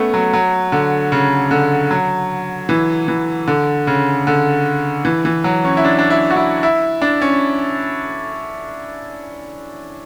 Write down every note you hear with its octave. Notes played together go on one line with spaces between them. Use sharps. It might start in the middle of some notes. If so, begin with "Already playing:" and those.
Already playing: A3 B3 C#4
F#3
F#3
D3
C#3
D3
F#3
E3
E3
D3
C#3
D3
E3
E3
F#3
C#4
E4
D4
D4
E4
F#4
E4
E4
D4
C#4